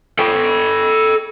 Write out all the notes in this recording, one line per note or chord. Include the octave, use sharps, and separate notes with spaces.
A4 G5